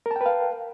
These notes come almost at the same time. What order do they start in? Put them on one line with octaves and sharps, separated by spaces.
A#4 A5 G5 B4 F5